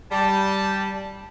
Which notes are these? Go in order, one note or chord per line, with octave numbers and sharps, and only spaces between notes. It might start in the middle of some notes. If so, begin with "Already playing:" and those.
G3 A5